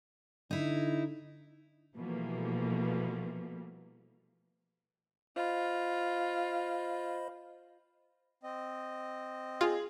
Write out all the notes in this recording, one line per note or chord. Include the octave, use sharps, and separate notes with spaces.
D3 D#4 E4
B2 E3 F3 G3 A3 A#3
F4 C5 D#5 B5
C4 D#5
F4 G#4